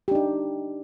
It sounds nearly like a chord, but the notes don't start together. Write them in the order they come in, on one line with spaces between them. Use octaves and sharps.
G4 D4 D#4